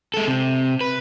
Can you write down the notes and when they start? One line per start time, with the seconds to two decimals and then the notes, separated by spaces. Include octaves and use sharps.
0.14 G#3 A4
0.27 C3
0.81 B4